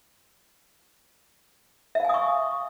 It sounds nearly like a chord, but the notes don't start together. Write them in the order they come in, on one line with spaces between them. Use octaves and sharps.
E5 F5 G#5 D#6 C#6